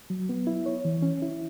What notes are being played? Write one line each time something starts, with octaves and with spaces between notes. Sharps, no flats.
F#3
B3
E4
C#5
E3
C#4
E4